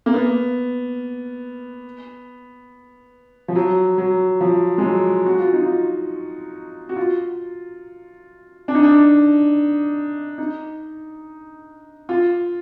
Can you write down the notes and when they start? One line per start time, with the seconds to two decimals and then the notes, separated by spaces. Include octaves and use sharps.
0.06 A#3
0.14 B3
3.48 F3
3.55 F#3
3.98 F#3
4.41 F3
4.78 G#3
4.83 F#3
5.26 F#4
5.39 F4
5.53 D#4
5.66 F4
6.89 F#4
6.96 F4
8.68 D4
8.75 D#4
8.83 D4
10.38 D#4
12.09 F4